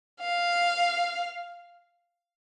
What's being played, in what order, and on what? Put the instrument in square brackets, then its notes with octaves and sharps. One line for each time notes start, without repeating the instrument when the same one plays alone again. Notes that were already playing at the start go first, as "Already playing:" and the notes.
[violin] F5